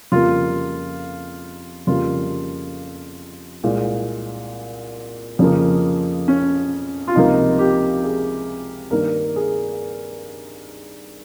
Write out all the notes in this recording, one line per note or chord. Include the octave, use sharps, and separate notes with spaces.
F2 C#3 G3 A#3 F4
F2 C#3 G3 A#3 F4
C2 A#2 G#3
F2 C#3 F3 A#3
C#4
F4
C#2 C3 F3 A#3 D#4
G4
G#4
G2 D#3 A#3 A#4
G#4